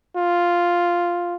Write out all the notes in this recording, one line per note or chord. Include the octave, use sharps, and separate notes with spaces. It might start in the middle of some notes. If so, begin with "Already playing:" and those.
F4